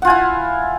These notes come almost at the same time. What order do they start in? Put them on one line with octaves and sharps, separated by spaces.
F#5 F4 G#5 E4